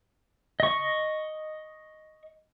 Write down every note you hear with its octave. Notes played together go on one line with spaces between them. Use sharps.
D#5 C#6